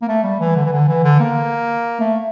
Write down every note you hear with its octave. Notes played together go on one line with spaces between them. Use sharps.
A#3
A3
G3
E3
D3
E3
D3
E3
D3
A#3
A3